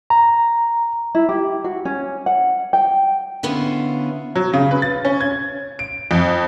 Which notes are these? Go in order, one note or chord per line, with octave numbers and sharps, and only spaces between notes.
A#5
E4
G4
F#4
C#4
F#5
G5
D3 B3 C#4 E4 F4
F#3
C#3
B4
A6
C#4
G#6
D7
F2